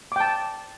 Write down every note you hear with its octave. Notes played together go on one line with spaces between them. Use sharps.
G5 A5 D6